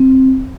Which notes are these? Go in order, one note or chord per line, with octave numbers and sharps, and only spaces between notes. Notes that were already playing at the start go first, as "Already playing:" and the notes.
Already playing: C4